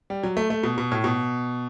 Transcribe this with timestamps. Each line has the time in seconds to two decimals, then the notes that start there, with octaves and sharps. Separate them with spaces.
0.10 G3
0.23 F#3
0.37 A3
0.50 A3
0.63 B2
0.78 B2
0.92 A2
1.04 B2